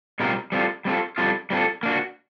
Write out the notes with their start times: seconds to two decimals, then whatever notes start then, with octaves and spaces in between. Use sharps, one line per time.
0.20 B2 G3 C4 F4 A#4
0.52 G3 C4 F4 A4
0.85 G3 C4 F4 A4
1.18 G3 C4 F4 A4
1.50 G3 C4 F4 A4
1.83 A#3 D4 F#4